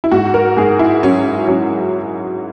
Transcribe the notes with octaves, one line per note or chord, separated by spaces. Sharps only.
E4
G#2 F#4
A#4
G#2 G#4
E4
F#3 C#4
F#3 C#4